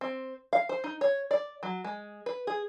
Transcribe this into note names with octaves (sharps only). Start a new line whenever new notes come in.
C4
F5
C5
D#4
C#5
D5
F#3
G#3
B4
G#4